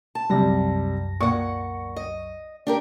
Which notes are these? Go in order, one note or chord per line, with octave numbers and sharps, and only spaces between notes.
A5
C2 F#2 C3 G3 A#6
A#2 F#5 C#6
D#5
D4 G4 A#4